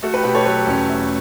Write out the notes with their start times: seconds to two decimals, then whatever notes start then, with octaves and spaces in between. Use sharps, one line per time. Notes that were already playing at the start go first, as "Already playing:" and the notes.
0.02 A3 F#4 A4
0.14 G4 B4
0.24 B2 G4 B4
0.35 A4 C#5
0.46 F#3 G4 B4
0.67 E2 C#4
0.89 A3